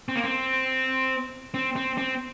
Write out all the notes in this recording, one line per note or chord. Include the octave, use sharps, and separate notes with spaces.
C4
A#3
C4
C4
C4
C4